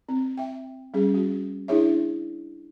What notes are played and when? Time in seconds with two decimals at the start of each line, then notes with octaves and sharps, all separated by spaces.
0.09 C4
0.37 E5 G5
0.94 G3 C#4 G#4
1.14 F#4
1.68 D4 E4 G#4 C#5 E5